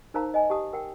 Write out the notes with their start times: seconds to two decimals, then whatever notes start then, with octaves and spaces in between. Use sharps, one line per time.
0.14 D#4 A#4 C5 F5 A5 A#5
0.34 D#5 G#5
0.50 G4 F#5 A5 D#6
0.73 A#4 F#5 G5